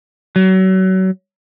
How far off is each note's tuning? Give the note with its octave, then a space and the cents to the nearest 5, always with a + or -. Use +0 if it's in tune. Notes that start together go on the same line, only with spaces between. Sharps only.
F#3 +30